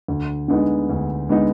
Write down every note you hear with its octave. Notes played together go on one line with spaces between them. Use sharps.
D2
D3 G#3 B3 D#4
D2
D3 G#3 B3 D#4